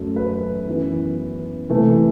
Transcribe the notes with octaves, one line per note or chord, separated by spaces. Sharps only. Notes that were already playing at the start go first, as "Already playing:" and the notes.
Already playing: F#2 F#3 A3
B4
F#2 E3 B3
C3 E3 A3